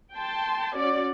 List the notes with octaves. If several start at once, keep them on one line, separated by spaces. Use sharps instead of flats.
G5 A5 C6
C#4 F#4 D5